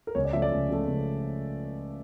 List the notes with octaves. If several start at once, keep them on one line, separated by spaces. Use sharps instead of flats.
A#4
C#2 C#5
D5
C#3 F3 A3 E5
D5
C#2
C#3 F3 A3
C#2